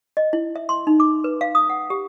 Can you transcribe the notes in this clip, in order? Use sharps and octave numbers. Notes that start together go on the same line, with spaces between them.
D#5
E4
E5
C6
D#4
D6
B4
F5
D#6
F#5
G4